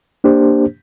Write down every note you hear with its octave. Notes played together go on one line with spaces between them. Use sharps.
A#3 D4 G4 C5